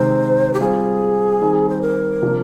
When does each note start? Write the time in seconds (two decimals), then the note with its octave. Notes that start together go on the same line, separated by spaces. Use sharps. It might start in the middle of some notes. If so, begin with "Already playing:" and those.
Already playing: C3 D#3 G#3 C5
0.54 G4
0.60 G3 C4 F4 G#4
1.42 D#3 G3 C4
1.69 C5
1.82 A#4
2.22 C3 F3 A#3 D4